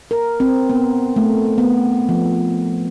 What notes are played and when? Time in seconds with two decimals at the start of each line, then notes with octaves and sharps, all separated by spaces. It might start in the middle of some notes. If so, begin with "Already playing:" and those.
0.11 A#4
0.40 C4
0.70 B3
1.16 A3
1.58 B3
2.09 F3